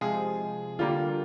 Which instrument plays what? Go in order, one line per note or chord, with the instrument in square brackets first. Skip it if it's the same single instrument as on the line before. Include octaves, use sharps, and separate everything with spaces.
[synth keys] C3 F3 G#3 [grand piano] G#4
[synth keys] D3 G3 A#3 [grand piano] F4